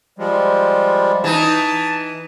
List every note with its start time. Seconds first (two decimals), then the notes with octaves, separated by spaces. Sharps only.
0.19 F3 G3 G#3
1.24 E3 D#4 A5